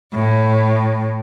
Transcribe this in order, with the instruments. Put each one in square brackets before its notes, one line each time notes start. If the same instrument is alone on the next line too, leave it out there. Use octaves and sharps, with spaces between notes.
[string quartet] A2